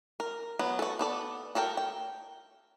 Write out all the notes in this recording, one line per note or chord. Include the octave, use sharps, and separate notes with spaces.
A#4
F#3 B3
F#4 A4
B3 A4 D5
F#4 A4 A#4 G5
G5